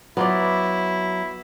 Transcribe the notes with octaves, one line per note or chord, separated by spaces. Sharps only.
F#3 B3 E4 F4 D5